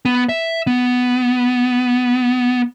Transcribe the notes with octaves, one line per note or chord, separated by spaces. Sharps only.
B3
E5
B3